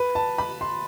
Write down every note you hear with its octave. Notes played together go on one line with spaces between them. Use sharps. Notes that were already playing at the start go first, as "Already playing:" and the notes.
Already playing: B4
A5
B5
C6